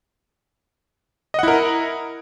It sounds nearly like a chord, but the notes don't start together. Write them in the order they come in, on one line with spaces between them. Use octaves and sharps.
D#5 F#5 E4 A#4